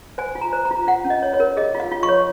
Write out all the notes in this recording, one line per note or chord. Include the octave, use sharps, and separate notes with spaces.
C5 G#5
F4
A#5
C5
A#5
F4
F4 F#5
C#4
D#5
C#5
C#5
A#4
G#4 D#5
F4
F5
F4
C#6
C#5